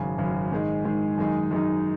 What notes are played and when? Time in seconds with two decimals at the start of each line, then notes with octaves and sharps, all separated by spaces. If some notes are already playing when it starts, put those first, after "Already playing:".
Already playing: G#1 F#2 C#3
0.18 G#1 F#2 C#3
0.52 G#2 D#3 G#3
0.85 G#2 D#3 G#3
1.18 F#2 D#3 G#3 D#4
1.51 F#2 D#3 G#3 D#4